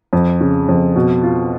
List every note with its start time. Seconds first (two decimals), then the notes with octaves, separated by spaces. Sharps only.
0.13 F2
0.41 C#3
0.69 F2
0.96 B2
1.23 F4